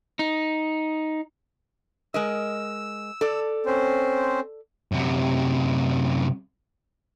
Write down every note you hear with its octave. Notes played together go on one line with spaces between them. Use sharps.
D#4
G#3 A#4 D#5 E6
A4 D5
C4 C#4 C5
F#2 C3